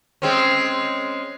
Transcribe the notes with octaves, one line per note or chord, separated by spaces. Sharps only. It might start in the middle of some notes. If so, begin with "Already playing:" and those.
G#3 C4 C#4